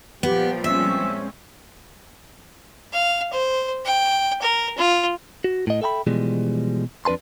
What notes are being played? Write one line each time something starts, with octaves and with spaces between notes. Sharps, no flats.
A#2 F3 G3 B3 G4 G5
G#3 C4 C#4 E5 E6
F5
C5
G5
A#4
F4
F#4
A2 D#5
A4 E5 G5 A#5 B5
B2 E3 F3 G3 G#3
F2 D4 B4 A5 C6